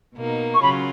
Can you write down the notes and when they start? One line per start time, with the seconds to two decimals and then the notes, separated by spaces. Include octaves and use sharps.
0.16 B2 A#3 D#4
0.54 C#6
0.61 C#3 F#3 C#4 F4 B5